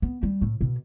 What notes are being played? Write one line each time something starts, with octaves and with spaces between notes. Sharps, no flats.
B3
G3
A2
B2